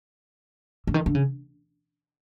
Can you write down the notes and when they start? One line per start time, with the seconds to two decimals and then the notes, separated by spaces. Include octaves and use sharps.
0.87 D3
0.94 D#3
1.06 D3
1.15 C#3